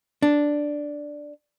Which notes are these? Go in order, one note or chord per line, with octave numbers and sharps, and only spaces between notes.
D4